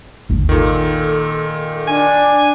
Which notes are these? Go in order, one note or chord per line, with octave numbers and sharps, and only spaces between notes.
G#1 D#2
A#2 D#3 A4
D4 G#5